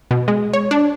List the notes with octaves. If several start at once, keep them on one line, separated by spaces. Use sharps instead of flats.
B2
G#3
C#5
D4